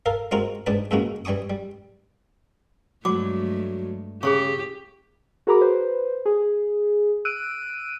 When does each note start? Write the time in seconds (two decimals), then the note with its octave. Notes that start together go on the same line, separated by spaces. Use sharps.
0.06 A4 A#4 F5
0.31 G#3 C4 F4 F#4 A#4
0.66 G#2 D4 G#4 B4 A5
0.91 E2 A2 C#3 G#3 A#3 F#4
1.25 E3 G3 G#5 C#6 D#6
1.50 G3
3.05 G2 F#3 G#3 A3 F#4 D6
4.23 C#3 G4 G#4 C#5 C#6
5.47 F#4 G#4 A#4 A#5 B5 D6
5.61 B4 C5
6.26 G#4
7.25 E6 F#6 D7 D#7